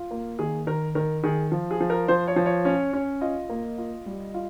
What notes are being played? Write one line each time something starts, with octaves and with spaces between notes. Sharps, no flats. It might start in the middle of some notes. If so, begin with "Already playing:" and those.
Already playing: F4
A#3
D#3 G#4
D#3 A#4
D#3 A#4
D#3 G#4
F3
G#4
F3
A#4
F3 C5
C#5
F3
C#5
C#4
C#4
F4 D#5
A#3
F4
G3
F4